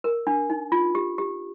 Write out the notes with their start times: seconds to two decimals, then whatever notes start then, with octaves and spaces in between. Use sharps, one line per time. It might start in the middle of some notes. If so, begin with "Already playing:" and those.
0.04 A#4
0.27 D4
0.50 D#4
0.72 F4
0.95 G4
1.18 G4